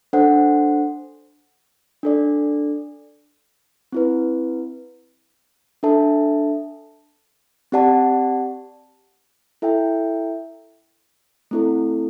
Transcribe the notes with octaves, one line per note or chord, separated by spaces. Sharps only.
D4 A4 C5 F#5
D4 A4 D5
C4 E4 B4
D4 A4 E5 A5
C4 G4 D5 F#5 A5
E4 A4 E5 G5
A3 C4 E4 A4